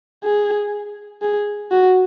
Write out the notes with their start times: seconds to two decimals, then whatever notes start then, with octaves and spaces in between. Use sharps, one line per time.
0.24 G#4
1.22 G#4
1.71 F#4